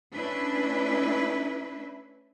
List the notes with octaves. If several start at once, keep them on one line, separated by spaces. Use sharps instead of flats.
A3 C#4 D4 E4 B4